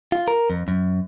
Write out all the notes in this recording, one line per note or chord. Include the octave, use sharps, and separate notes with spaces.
F4
A#4
F2
F#2